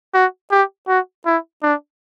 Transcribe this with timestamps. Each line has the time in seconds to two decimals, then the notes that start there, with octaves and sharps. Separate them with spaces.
0.14 F#4
0.51 G4
0.88 F#4
1.26 E4
1.63 D4